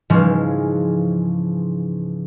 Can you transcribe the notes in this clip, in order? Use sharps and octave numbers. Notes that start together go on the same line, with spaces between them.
G#2 C#3 E3 F3 G#3